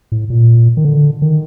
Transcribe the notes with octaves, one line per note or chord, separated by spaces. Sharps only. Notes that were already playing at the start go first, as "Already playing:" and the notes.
A2
A#2
D#3
D3
D#3